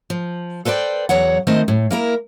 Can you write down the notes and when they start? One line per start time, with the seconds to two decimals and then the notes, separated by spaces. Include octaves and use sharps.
0.10 F3
0.65 A4 B4 C5 D5 G5
1.09 E2 F#3 C#5 F#5
1.47 D#3 A3 C4 C5 D#5
1.68 A2
1.91 A#3 E4 A#4